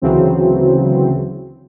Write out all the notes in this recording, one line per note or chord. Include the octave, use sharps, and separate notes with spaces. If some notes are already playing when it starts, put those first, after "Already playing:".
D2 C#3 E3 F#3 C4